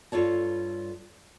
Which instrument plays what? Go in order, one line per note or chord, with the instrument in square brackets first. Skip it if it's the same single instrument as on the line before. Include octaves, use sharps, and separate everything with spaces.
[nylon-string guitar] G2 F4 A4 C#5 A5